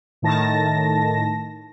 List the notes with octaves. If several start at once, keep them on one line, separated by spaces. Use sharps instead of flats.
A2 D#3 A5 A#6